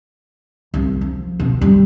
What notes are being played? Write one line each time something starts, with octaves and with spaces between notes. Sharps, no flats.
C2
F3
B2
G3